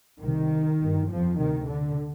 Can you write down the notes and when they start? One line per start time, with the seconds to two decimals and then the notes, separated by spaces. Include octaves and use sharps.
0.20 C2 C3 D#3
0.79 G1 G2
1.09 F2 F3
1.39 D2 C3 D#3
1.67 D3